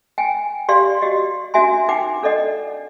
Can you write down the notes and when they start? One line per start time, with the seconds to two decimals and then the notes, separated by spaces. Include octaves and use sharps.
0.18 G5 G#5
0.69 G4 D5 F5 C6
1.02 F#4 G4 D#5
1.54 C#4 D4 F#4 E5 G#5 C6
1.88 D#4 B4 F#5 G5 D6
2.23 D4 A4 D5 D#5 F#5